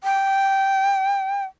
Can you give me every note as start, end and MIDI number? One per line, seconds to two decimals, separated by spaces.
0.04 1.44 79